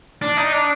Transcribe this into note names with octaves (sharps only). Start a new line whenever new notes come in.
D4
D#4
D4